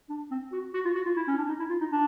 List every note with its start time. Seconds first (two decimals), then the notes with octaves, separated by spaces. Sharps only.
0.09 D4
0.31 C4
0.52 F#4
0.74 F#4
0.85 F4
0.95 F#4
1.06 F4
1.17 E4
1.28 C#4
1.38 D4
1.49 D#4
1.60 E4
1.70 F4
1.81 D#4
1.91 D4